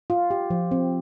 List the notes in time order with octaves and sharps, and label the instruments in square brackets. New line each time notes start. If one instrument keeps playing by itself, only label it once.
[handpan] F4
G4
F3
C4